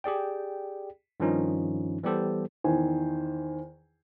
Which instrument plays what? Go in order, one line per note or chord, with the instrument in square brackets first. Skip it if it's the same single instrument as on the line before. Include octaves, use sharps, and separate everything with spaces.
[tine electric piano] G4 G#4 D5 G5
G2 D#3 F3 C#4 D#4 F4
E3 G3 B3 G4 A4 C5
[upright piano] E2 D#3 C5 G#5